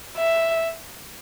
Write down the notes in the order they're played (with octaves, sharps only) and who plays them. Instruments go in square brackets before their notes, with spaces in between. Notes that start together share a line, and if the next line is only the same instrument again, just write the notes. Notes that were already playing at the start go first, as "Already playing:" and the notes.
[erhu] E5